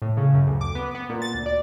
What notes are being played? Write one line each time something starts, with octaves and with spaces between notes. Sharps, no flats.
A2
C#3
F#2
D2
D6
B3
B3
A#2
A6
D2
D5